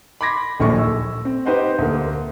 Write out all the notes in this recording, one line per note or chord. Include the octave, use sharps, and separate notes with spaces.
B5 C6 D6 G#6 A#6 B6
D1 A#1 D#2 A#2 A3 C#6
E6
C4
D#4 G4 B4 C5 D#5 F#5
D2 A#3